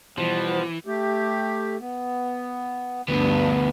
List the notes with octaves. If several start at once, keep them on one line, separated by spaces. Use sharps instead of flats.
B2 E3 F3 G3 B3 C5
A3 G4
B3
D2 G2 B3